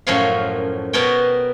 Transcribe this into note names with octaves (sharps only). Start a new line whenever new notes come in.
F#2 A2 F3 A#4 C#5 F5
B2 B3 A#4 C#5 G5